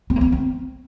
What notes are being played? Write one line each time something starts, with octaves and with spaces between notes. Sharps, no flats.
C4
A#3
C4
C4